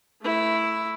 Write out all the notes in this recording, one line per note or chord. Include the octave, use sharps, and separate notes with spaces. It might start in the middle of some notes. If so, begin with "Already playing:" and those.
A3 E4